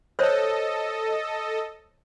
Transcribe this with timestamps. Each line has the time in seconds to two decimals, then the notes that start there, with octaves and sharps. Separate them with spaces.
0.19 A4 C5 C#5 D#5